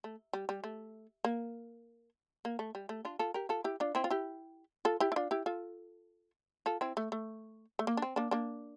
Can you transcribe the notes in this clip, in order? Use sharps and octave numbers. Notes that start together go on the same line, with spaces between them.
A3
G3
G3
A3
A#3
A#3
A3
G3
A3
D4 F4
F4 A4
G4 A#4
F4 A4
E4 G4
D4 F4
C4 E4
F4
E4 G4
F4 A4
E4 G4
E4
D4 F4
E4 G4
F4 A4
F4 A4
C4 E4
A3
A3
A3
A#3
D4
C4
A#3 D4
A#3 D4